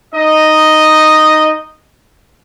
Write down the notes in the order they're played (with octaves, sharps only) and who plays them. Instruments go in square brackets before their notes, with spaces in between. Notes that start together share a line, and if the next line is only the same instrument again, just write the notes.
[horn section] D#4 D#5